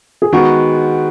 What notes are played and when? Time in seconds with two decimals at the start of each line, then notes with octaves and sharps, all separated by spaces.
0.22 G#4
0.33 D#3 G#3 B3 F#4